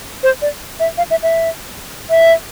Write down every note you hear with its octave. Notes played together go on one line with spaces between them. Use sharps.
C5
D5
E5
F5
E5
E5
E5